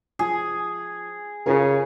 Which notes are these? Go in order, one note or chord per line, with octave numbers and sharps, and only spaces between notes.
F3 G#4
C#3 F4 G#4 A#4